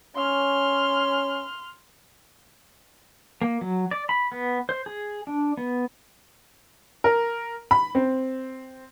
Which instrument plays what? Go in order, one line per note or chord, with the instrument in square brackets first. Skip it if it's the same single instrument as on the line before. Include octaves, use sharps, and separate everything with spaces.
[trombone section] C#4 [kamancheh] C6 F6
[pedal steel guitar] A#3
F#3
D5
B5
B3
C5
G#4
D4
B3
[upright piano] A#4
B5
C4